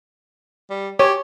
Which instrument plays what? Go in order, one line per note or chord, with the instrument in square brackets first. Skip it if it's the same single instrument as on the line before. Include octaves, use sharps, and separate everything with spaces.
[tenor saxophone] G3
[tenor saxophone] G4 [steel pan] C#5